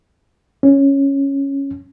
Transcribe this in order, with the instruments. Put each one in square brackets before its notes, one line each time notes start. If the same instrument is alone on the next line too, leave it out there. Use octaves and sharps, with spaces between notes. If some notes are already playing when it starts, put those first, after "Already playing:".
[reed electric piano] C#4